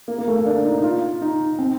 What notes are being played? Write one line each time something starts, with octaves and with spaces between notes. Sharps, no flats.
A#3
A#3
A3
A#3
D4
D#4
D#4
F4
D#4
C4